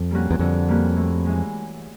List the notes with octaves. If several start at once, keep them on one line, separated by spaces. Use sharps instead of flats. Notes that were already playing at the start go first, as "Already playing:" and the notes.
Already playing: F2
G3 A#3 C#4 F#4
E2
F2 D3
G3 A#3 C#4 F#4
A2
E3 G#3 C#4